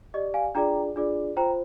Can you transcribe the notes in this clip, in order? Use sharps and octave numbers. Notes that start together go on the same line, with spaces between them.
G4 D5 D#5
F5 G#5
D4 F4 G#4 D5 G5 A#5
D4 F4 G#4 D5
F4 C5 G5 A#5